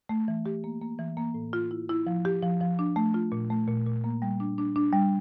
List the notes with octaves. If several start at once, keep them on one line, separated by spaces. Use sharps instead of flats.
A3
E3
G4
A#3
A#3
E3
A#3
A2
F4
E4
E4
F3
G4
F3
F3
D4
A3
F4
A#2
A3
A#2
A#2
A#3
G3
D4
D4
D4
G3